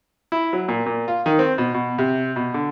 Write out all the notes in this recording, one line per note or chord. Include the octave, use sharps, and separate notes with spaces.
E4
F#3
A#2
A#2
F4
D#3
C4
B2
B2
C3
B2
D3